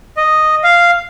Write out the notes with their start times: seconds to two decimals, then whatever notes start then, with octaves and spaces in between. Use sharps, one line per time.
0.17 D#5
0.64 F5